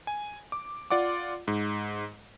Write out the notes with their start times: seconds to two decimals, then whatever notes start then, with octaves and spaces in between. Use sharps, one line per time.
0.07 G#5
0.52 D6
0.90 F4 D5 F#5 D6
1.48 G#2